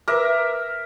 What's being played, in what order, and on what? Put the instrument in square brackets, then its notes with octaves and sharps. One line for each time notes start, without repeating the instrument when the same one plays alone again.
[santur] A#4 E5 [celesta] B4 D6